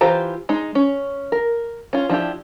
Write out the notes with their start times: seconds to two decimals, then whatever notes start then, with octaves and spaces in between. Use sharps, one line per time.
0.01 E3 F4 G4 C5 A#5
0.49 G#3 D#4
0.75 C#4
1.32 A#4
1.93 C#4 F4
2.09 F3 D4 E4 G4